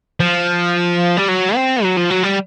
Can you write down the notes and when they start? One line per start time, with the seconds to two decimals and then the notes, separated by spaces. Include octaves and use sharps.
0.20 F3
1.17 G3
1.28 F#3
1.55 C4
1.83 F#3
1.97 F3
2.10 F#3
2.23 G3